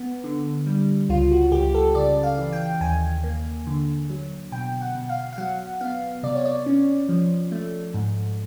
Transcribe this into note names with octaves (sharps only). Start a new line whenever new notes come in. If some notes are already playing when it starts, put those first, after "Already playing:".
Already playing: B3
D3
G3
C#2 F4
F#4
C#2 G4
A4
C#3 D5
F5
E3
G5
D#2 G#5
A#3
D3
F#3
B2 G5
F#5
B2
F5
F5
F#3 F#5
B3 F5
C3 D5
C#5
D5
C#4
F3
A3
G#2